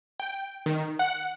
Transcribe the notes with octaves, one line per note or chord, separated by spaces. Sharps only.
G5
D#3
F#5